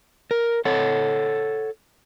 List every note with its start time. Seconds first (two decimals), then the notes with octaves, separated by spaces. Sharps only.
0.31 A#4
0.65 A4 C#5 F#5